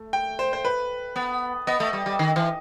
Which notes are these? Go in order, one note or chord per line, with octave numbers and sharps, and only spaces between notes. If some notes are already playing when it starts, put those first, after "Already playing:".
Already playing: A3
G5
C5
C5
B4
B3
B3 D#5
A3
G3
G3
D#3
E3